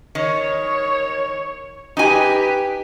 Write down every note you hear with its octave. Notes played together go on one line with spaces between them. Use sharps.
D#3 C#5
D#4 G4 B4 G#5